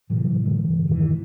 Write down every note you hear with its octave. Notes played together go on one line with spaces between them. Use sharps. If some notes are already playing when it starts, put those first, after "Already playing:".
A2 C3 E3 F#3
G2 D3 E3 G#3
E1 G#2 D#3 E3